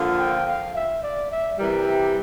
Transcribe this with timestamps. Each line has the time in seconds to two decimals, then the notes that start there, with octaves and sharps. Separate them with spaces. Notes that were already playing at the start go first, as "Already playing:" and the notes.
Already playing: D3 F3 A#3 F4
0.19 G5
0.47 F5
0.75 E5
1.03 D5
1.32 E5
1.59 C3 E3 G3 A#4
1.88 G4